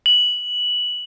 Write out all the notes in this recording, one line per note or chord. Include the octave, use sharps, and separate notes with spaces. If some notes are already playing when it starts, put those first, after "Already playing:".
F#7